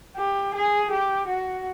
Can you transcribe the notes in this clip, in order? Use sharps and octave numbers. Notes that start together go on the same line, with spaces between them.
G4
G#4
G4
F#4